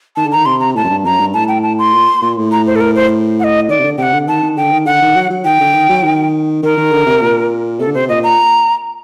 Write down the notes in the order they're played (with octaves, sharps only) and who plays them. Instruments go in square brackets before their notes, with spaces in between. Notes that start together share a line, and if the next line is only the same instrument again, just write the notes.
[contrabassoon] D#3 [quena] A5
[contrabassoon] D3
[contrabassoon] D#3 [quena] A#5
[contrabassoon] C3 [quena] C6
[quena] A#5
[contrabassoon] A2 [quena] A5
[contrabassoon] F#2
G2
[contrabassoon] F#2 [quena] A#5
[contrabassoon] G2
[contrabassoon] A2 [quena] A5
[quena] G5
A5
C6
[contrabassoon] A#2
A#2
A2
[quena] A#5
C5
A4
A#4
C5
F#5
D#5
[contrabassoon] D#3 [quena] D5
[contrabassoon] C3
D3
[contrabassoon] C3 [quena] F#5 G5
[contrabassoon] D3
[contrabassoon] D#3 [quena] A5
[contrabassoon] D#3
[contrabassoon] D3 [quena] G5
[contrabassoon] D#3
[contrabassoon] D3 [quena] F#5
[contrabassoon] D#3
F#3
F#3
[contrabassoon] D#3 [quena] G5
[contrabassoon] D3
D#3
F#3
D#3
[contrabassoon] D#3 [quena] A#4
[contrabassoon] D#3
D3
C3
A#2
[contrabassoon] C3 [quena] A4
[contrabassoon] D3
[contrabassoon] C3 [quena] C5
[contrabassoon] A#2 [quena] D#5
[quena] A#5